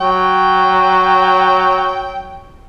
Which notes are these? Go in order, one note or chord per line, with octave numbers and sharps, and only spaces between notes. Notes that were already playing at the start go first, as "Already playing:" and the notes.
F#3 G5